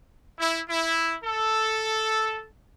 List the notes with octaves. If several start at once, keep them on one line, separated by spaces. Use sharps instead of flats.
E4
E4
A4